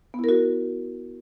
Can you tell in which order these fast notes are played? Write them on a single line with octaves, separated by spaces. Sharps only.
B3 E4 A#4 F#4